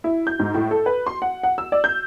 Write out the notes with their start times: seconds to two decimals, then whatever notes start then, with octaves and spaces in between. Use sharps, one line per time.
0.04 E4
0.27 G6
0.39 G#2
0.54 A2
0.71 A4
0.86 B4
1.07 C6
1.22 F#5
1.43 F#5
1.58 E6
1.72 D5
1.84 G6